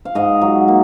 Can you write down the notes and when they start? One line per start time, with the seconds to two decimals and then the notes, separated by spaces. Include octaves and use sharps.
0.05 F5
0.15 G#2 D#5
0.42 F#3
0.68 A#3